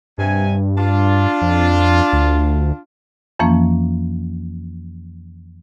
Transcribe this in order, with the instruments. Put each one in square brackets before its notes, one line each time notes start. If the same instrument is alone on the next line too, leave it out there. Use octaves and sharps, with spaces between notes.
[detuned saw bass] G2 [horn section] C3 G#5
[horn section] D4 F4
[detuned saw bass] F2
D2
[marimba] F2 E3 F3 A#3 C#4